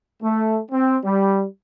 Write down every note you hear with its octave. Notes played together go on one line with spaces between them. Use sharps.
A3
C4
G3